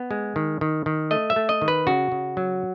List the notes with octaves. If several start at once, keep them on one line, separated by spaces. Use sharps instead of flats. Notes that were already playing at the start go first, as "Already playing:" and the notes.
Already playing: B3
G#3
D#3
D#3
D#3
A3 D#5
E5
A3
D#5
D#3
B4
C#3 F#4
C#3
F#3